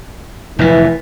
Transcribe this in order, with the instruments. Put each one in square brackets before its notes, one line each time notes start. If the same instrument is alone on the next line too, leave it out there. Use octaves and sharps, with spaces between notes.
[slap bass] F1 F2 A#2 [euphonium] E3